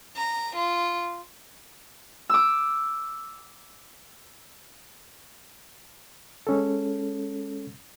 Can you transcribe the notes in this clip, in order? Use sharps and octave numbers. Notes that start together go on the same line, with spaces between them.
A#5
F4
D6 E6
G#3 C#4 A4